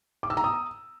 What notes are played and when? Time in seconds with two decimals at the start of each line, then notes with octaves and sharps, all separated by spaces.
0.23 D6
0.30 E6
0.37 A#5
0.44 D#6